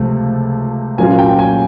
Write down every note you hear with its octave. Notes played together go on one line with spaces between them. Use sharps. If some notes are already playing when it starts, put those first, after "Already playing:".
Already playing: C#2 C3 F3 A3
A#2 F#3 A#3 C#4 F4 G#5
G5
G#5